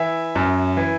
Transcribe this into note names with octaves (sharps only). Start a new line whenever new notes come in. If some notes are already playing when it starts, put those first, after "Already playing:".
Already playing: E3 E5
F#2
E3